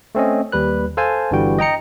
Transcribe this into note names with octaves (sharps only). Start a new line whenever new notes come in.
A3 C4 C#4 D#5
D#2 G3 B4 F#6
A4 C5 F5 G#5 A5
G1 D3 E3 G3 F#4 G5
D#5 G5 A#5 C#7